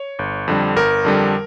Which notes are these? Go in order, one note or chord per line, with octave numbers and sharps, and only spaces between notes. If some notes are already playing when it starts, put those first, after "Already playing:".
Already playing: C#5
G1
F2 D3 G3
G1 A#4
F2 D3 G3